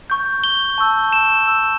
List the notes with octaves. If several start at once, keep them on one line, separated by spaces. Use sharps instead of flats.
C#6 G6
G7
A5 C#6 E6 G6
E7
B5 E6 G6